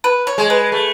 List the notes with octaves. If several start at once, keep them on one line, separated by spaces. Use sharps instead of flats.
B4
C#5
G#3
B4
A3